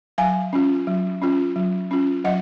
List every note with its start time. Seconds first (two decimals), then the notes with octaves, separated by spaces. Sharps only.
0.18 F#3 F5 G#5
0.53 C#4 F4
0.87 F#3
1.22 C#4 F4
1.56 F#3
1.91 C#4 F4
2.24 F#3 D#5 F#5